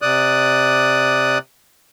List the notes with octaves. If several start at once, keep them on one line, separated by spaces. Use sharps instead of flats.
C3 D5 D#6 F#6